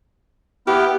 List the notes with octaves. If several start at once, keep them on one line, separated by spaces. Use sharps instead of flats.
B3 E4 G4 F6